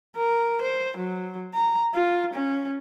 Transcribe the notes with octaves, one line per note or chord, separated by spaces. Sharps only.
A#4
C5
F#3
A#5
F4
C#4